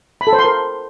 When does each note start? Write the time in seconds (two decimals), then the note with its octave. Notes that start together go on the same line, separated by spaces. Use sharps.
0.21 B5
0.27 A4
0.33 C5
0.39 C6
0.45 A#4